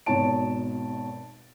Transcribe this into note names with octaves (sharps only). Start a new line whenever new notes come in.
G#1 B2 D#4 C#5 A5 D7